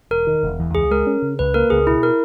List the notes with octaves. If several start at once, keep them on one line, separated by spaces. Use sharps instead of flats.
E1 A#4
D#3
E1
E2
C#2 G#4
G#3 A#4
C#4
C#3
C#2 B4
A#3 A#4
C#2 G#4
B2 E4
A#4